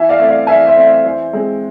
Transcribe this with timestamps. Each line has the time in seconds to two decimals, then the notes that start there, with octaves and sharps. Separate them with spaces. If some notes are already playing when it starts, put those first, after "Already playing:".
Already playing: E3 E5 G#5
0.09 D5 F5
0.19 A3 C4
0.29 D5 F5
0.47 E3 E5 G#5
0.67 C5 E5
0.77 A3 C4
0.85 C5
1.04 E3 C5
1.33 G#3 C4